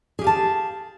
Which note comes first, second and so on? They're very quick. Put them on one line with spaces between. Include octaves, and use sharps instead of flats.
G#4 G4 F5 A5